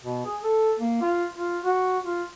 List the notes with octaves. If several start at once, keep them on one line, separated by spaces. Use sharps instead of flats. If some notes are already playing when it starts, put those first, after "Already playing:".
B2
G#4
A4
A#3
F4
F4
F#4
F4